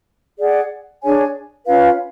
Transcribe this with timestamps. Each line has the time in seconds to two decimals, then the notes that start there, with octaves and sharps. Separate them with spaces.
0.38 G#4 D5 F#5
1.02 D4 G#4 C#5 G#5
1.66 C#4 F4 B4 F5